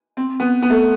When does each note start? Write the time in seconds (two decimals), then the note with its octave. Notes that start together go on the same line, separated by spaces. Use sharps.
0.17 C4
0.40 B3
0.62 B3
0.70 A3